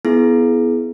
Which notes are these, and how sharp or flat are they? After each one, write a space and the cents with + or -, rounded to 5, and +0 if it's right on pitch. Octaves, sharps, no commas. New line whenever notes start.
B3 +0 E4 +0 G#4 +25